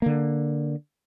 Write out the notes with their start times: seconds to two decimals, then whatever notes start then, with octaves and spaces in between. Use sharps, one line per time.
0.02 D3 A#3